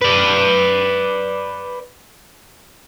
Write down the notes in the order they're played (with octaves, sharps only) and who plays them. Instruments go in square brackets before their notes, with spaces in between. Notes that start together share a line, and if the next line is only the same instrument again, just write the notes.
[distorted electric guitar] B4 D5